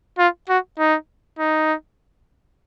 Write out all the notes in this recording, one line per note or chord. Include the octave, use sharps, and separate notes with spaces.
F4
F#4
D#4
D#4